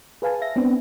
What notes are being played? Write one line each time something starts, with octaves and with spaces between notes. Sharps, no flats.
G#4 B4 F5 G#5 A5
E5 A#6
B3 C4 D4